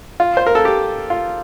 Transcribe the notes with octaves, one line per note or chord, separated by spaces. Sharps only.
F4
C5
A#4
A4
G4
F4